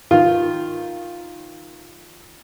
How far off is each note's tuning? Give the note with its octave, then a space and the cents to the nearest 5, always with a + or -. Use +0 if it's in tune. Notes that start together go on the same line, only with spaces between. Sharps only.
D#3 +0 F4 +0